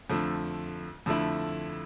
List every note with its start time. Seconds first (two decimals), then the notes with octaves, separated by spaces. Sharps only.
0.10 F2 D3 A3
1.06 F2 D3 A3 E4